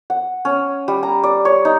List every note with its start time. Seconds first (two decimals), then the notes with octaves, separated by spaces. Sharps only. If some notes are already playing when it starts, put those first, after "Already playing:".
0.10 F#5
0.45 C#4
0.88 G3
1.03 A#5
1.23 D5
1.45 C#5
1.65 D#4